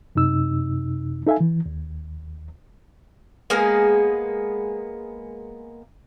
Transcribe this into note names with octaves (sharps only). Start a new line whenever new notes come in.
F#2 C3 D#4 E6
D#4 A4 E5 F5 G#5
E3
D#2
G#3 A#3 B3 G#4